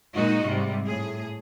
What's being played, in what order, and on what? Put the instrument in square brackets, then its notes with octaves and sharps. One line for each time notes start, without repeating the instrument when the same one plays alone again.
[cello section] A#2 G#3 D#4 F#4 D#5
G#2 C3 G3
A2 G#4